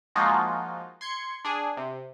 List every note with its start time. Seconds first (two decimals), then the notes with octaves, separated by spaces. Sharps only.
0.16 F3 G#3 A#3 D#4 F4 F#4
1.01 C6 G#6 C#7
1.45 D4 G#4
1.77 C3